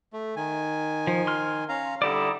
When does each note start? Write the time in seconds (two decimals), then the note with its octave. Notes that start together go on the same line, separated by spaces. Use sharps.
0.13 A3
0.36 D#3 G#5
1.07 F3
1.27 C6 F6
1.69 C#4 F5 A#5
2.02 D3 G3 D#4 E4 D5